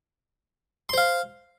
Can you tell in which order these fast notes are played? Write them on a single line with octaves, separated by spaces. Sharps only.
C6 C5 F5